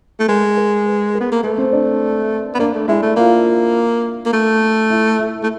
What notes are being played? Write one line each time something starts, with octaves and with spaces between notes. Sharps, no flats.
A3
G#3 A#4
A#4
B4
A#4
B3
A#3
A3 B4
C4 C5
D4 D5
B3
A#3 D4 D5
A3
G#3 E4 E5
A3
A#3 F4 F5
A#3
A3
E4 E5
E4 E5
A3